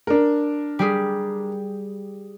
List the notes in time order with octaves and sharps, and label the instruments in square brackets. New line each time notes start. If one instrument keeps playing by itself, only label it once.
[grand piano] D4 A#4
[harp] G3 G4 G#4